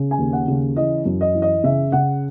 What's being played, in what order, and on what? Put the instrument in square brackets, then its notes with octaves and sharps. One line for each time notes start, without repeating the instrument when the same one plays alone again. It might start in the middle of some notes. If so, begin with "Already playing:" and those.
Already playing: [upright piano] C#3
G#5
D#2
F#5
C#3
E3 D#5
F#2
D#5
E3
D#5
C#3 E5
C#3 F#5